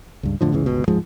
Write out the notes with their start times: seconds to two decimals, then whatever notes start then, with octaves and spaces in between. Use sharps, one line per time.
0.23 C#2 G2
0.41 F2 A2 D3 F3
0.52 G1 C#2 C#3 E3
0.66 G1 C#2 B2
0.88 D1 G#2 F3 G#3